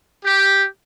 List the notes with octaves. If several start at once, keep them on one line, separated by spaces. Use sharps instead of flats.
G4